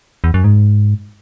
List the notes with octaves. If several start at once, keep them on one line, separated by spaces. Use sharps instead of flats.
E2
F#2
G#2